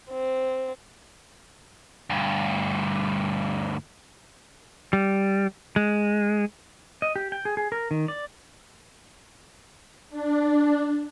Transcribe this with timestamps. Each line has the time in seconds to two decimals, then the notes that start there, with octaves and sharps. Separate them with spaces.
0.10 C4
2.10 D2 G2
4.93 G3
5.76 G#3
7.02 D#5
7.16 G4
7.32 G5
7.45 G#4
7.57 G#4
7.72 A#4
7.91 D#3
8.08 D5
10.10 D4